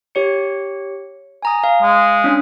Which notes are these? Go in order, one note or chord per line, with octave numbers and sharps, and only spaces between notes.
G4 C#5 C#7
G#5 A#5 D#6
F5
G#3
C#4 D4